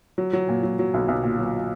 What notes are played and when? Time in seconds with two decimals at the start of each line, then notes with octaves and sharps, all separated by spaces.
0.18 F#3
0.33 F#3
0.49 A#2
0.63 F#3
0.79 F#3
0.94 B1
1.08 B1
1.23 A#2
1.39 F#3